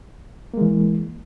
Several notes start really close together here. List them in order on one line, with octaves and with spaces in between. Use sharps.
A#3 G#3 E3